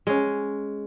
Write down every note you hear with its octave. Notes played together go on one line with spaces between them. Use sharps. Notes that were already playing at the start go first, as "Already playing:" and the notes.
G#3 C#4